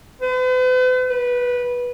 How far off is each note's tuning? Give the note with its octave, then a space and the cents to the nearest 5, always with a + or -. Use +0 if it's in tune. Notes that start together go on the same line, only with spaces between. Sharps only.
B4 +45
B4 -10